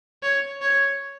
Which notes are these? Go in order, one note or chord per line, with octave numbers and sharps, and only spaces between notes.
C#5
C#5